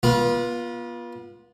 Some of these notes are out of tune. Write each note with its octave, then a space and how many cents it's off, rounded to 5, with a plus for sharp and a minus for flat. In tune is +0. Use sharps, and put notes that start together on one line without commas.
B3 -35 F4 +0